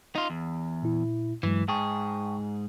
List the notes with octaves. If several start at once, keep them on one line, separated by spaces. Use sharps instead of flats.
D#4 F4
E2
A#2 E4
G2 E3 F#3 G#3
G#2 G#4 G5 A5 C#6